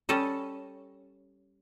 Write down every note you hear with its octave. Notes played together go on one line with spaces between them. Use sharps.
G3 C#4 A4 D#5